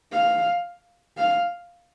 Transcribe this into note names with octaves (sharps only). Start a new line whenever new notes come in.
F5
F5